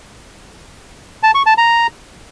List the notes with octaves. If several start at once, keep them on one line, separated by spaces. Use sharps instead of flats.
A5
C#6
A5
A#5